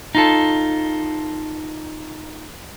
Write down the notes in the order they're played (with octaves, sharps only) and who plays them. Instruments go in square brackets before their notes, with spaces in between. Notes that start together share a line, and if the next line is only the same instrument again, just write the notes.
[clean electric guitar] D#4 F4 A4